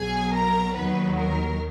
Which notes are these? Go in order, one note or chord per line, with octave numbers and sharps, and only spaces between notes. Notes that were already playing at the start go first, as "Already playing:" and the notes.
Already playing: B1 B2 F#3 G#4 G#5
A#4 A#5
D#2 D#3 F#3 B3 B4
A#4